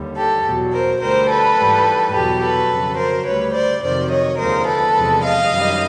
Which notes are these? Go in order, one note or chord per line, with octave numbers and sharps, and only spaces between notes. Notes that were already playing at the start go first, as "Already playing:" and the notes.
Already playing: D#2 D3 G3
G4 A4
E2 B2 F#3
A#4 C5
D2 D3 G3 A#4 C5
A4 B4
G#2 E3 G3
E2 B2 F#3 G4 A4
A4 B4
F2 C#3 F#3
A#4 C5
D2 D3 G3 B4 C#5
C5 D5
F2 C3 D#3 F#3 C5 D5
C#5 D#5
D#2 D3 F3 G#3 A#4 C5
A4 B4
E2 C3 F3 G#3
D#5 F5
F#2 D#3 G3